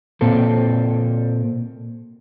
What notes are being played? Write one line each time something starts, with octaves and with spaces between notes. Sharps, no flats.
A#2 A#3 C4 A4